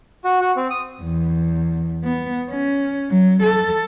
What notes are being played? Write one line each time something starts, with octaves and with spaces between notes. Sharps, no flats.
F#4
F#4
C4
D#6
E2
B3
C#4
F#3
A4